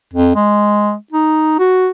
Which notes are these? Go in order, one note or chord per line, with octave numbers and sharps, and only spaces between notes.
F2
G#3
D#4
F#4